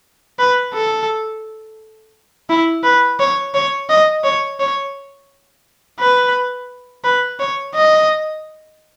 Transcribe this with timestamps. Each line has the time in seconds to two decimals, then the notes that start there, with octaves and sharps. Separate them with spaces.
0.39 B4
0.74 A4
2.49 E4
2.84 B4
3.19 C#5
3.54 C#5
3.89 D#5
4.24 C#5
4.60 C#5
5.99 B4
7.04 B4
7.40 C#5
7.75 D#5